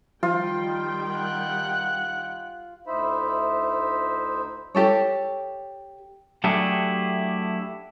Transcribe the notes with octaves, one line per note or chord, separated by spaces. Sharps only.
D#3 F3 G3 F4 G5
F#5 F#6
D2 D#4 E4 C5 E5 B5
G4 A4 C#5
F#3 A3 D4 E4 G4 G#4